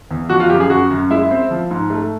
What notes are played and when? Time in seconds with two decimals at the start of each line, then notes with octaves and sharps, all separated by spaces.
0.11 E2
0.30 F3 F#4
0.40 F4
0.50 F#2 G4
0.60 G#4
0.70 F#2 F#4
0.90 F#2
1.10 G#3 E4
1.31 C4
1.51 F3
1.71 G#2
1.90 A3